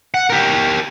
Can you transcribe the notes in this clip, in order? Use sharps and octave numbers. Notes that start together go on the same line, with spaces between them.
F#5
G4 A#4